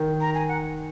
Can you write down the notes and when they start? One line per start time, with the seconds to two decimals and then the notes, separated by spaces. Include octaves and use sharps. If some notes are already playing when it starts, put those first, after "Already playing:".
Already playing: D#3
0.21 A#5
0.34 G#5
0.49 F#5